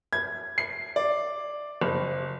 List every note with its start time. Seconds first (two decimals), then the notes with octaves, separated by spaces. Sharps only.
0.13 G#6
0.58 C7
0.96 D5
1.81 F#1